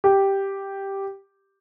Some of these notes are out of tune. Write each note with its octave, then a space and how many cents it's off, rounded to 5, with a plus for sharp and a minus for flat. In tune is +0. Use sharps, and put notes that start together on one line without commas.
G4 +0